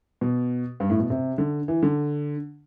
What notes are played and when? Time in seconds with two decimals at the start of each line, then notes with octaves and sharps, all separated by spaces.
0.21 B2
0.80 G2
0.90 A2
0.99 B2
1.10 C3
1.38 D3
1.68 E3
1.83 D3